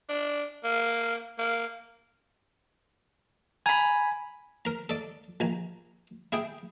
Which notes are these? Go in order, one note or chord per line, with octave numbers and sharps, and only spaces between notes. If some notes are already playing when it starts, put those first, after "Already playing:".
D4
A#3
A#3
G#5 A#5 B5
A#4 A#5
A4 D5
A#1 G#5 A#5
E4 G#4 G5